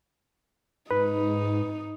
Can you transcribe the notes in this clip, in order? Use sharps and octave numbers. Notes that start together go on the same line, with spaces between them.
G#2 D#4 B4